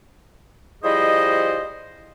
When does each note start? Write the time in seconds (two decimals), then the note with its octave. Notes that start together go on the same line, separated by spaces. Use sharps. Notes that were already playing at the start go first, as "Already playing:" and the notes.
0.84 F3 G3 E4 G#4 C5 D#5